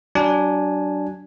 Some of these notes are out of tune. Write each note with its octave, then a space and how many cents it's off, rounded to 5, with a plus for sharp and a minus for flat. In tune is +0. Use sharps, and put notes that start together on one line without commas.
F#3 +35 D4 +0 G#5 +0